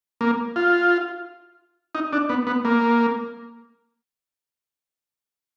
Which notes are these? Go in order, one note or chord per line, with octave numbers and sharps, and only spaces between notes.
A#3
F4
D#4
D4
B3
B3
A#3